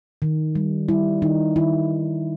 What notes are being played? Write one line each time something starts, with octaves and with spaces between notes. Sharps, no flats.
D#3
G3
G3 E4
D#3 D#4
D#3 E4